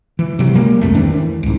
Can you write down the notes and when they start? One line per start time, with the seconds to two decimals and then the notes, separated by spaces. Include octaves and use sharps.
0.19 E3
0.39 C3 F#3
0.55 G3 G#3 A#3
0.81 G1 C2 F2 A3
0.94 D#3 E3 C4 D4
1.43 C2 G#2